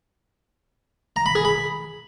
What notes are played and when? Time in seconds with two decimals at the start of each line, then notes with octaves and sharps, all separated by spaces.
1.16 A#5
1.26 B5
1.35 G#4
1.45 B5